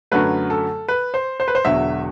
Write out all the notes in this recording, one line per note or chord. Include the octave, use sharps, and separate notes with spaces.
F#2 D3 F#3 A3 B4
A4
B4
C5
C5
B4
C5
E1 E2 D3 F#3 E5